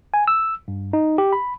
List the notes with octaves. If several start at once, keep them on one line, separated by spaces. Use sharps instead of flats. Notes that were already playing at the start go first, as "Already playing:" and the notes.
G#5
E6
G2
D#4
G4
B5